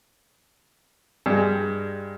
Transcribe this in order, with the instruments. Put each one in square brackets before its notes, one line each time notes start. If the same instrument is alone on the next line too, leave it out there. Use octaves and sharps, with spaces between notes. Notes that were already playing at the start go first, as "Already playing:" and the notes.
[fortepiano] G2 G#3